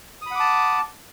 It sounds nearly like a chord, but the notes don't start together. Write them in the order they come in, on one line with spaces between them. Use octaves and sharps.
D#6 B5 F#5 D6 A5